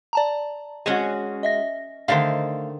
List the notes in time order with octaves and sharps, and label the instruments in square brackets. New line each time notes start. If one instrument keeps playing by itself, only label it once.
[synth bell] D5 A5 A#5
[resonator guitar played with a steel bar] G#3 F#4 [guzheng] C#4 F#5 G#5
[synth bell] D#5 E5 A#6
[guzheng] D3 D#3 C5 [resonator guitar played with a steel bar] A3 F5